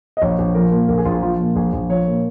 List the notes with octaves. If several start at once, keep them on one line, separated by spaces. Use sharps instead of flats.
D#5
A#1 C#5
A#1
F3 A#4
A#2
A#1 A#4
G#4
A#1 F4
G#4
F3 F4
A#2
A#1 G#4
A#1
F3 C#5
A#2